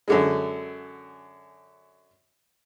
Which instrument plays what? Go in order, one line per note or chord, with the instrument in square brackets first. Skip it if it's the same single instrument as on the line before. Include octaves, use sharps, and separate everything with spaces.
[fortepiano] F#2 D3 G#3